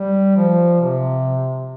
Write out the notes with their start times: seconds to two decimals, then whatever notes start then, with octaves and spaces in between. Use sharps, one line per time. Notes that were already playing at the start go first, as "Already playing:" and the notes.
Already playing: G3
0.37 F3
0.81 C3